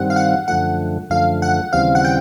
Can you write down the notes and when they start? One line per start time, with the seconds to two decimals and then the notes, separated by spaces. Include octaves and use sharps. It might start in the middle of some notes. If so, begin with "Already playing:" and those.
Already playing: G2 D#3 G3 C4 F#5
0.10 F5
0.16 F#5
0.48 F#2 D3 F3 A3 F#5
1.10 F#2 D3 F3 A3 F5
1.42 F#5
1.73 D#2 C#3 E3 G3 C4 F5
1.95 F#5
2.05 G5